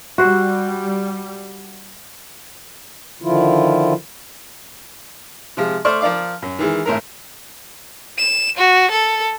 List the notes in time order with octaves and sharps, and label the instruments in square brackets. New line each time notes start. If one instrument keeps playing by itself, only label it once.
[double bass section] G3 [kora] F#4 C5
[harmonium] D3 D#3 F3 E4 F4
[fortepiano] C3 F3 G#3
A3 C5 D5 C#6 F6
F3 A#4 D5 F5 D6
F#2
D#3 E3 G#3
G#1 A2 A#4
[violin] E7
F#4
A4